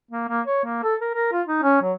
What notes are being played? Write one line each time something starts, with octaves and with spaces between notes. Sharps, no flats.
A#3
A#3
C#5
A#3
A4
A#4
A#4
F4
D#4
C#4
F#3